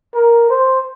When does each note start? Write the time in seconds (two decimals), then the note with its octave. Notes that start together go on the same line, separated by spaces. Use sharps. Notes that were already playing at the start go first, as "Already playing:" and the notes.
0.15 A#4
0.50 C5